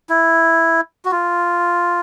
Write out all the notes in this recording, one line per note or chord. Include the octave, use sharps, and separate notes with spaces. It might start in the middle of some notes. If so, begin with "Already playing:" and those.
E4
F#4
F4